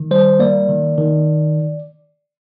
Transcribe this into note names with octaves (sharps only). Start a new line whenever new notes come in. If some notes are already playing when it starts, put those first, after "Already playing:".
Already playing: D#3
G3 C5
A#3 D5
D#3
D#3